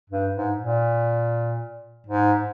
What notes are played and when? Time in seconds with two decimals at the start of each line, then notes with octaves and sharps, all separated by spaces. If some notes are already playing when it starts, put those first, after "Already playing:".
0.09 G2
0.34 G#2
0.59 A#2
2.07 G#2